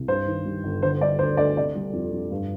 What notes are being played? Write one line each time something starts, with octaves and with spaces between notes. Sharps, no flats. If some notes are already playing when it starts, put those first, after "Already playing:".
Already playing: C2
G2 C5
D#3
G3
G1
D3 C5
G3 D5
D2 C5
D2 D5
C3 D5
G3
F2
F2
G2